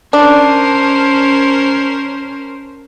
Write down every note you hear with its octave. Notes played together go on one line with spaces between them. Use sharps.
C#4 D4 A#4 C5